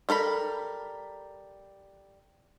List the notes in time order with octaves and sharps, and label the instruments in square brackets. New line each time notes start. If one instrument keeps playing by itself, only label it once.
[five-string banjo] G3 A4 A#4 B5